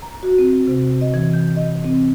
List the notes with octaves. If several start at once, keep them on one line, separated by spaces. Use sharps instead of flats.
A#5
F#4
C4
C3
D#5
E3
G6
D#5
C4